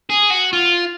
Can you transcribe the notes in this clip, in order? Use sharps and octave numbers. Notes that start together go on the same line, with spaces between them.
G#4
F#4
F4